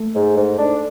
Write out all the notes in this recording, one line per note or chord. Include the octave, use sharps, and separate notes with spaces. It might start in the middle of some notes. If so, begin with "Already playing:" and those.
Already playing: A3
G#2
G#2
D4